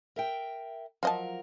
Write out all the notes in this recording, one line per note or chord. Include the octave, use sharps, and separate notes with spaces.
A#4 E5 G5
F3 F#3 F4 A#4 D#5 A5